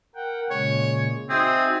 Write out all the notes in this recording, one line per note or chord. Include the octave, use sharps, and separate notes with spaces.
A#4 F#5 G5
A#2 C#3 G#3 C#5
C4 D#4 F#4 G#4 E5